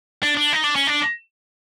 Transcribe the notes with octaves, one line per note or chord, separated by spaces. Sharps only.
D4
D4
D#4
D4
C#4
D4